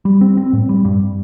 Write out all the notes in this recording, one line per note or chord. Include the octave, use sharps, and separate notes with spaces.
G3
C4
C4
A2
G3
G2